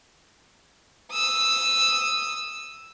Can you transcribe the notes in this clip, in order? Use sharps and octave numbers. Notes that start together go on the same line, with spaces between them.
D#6 E6